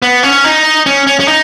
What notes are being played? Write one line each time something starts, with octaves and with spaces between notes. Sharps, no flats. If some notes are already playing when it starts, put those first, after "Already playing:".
B3
C#4
D#4
C#4
C#4
C#4
D#4